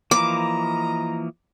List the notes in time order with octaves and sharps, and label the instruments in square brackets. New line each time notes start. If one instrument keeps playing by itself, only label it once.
[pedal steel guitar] E3 F3 A#3 [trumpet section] D#5 A#5 [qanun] D6